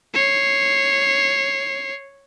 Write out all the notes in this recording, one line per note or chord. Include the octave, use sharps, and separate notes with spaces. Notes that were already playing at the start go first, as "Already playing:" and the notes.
C#5 C7